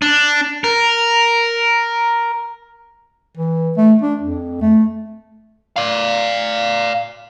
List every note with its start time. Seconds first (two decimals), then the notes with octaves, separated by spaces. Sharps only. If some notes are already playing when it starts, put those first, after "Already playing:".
0.02 D4
0.64 A#4
3.37 E3
3.77 A3
4.02 D4
4.21 F2
4.61 A3
5.76 D5 F5